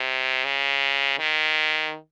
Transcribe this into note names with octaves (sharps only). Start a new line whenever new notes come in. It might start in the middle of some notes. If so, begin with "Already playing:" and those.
Already playing: C3
C#3
D#3